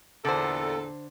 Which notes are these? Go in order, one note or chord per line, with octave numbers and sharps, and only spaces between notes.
E2 A#2 D3 A4 C5